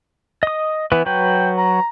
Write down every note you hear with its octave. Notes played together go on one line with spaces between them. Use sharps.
D#5 D#6
E3 B3 B4
F#3 B4 G5
A#5